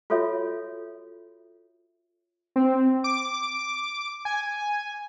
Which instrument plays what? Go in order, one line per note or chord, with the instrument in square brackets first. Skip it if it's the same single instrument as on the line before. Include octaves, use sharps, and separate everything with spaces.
[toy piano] F4 F#4 A4 C#5 E5
[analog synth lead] C4
D6
G#5